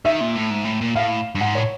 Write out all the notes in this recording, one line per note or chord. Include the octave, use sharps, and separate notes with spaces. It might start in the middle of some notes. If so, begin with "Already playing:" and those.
D#3 E5
A#2
A2
G#2
A2
A#2
A2 F5
G2
G#2 F#5
A2 C#5